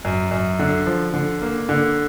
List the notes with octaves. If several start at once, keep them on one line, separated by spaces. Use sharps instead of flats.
F#2
F#2
D3
F3
D3
A#3
D3